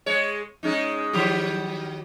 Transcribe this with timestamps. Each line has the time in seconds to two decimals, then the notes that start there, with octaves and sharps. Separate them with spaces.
0.06 G#3 C#5
0.63 G#3 C#4 D#4
1.13 D#3 F#3 G4